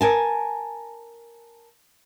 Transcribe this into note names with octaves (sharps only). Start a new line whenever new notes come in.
A#4 G#5 A5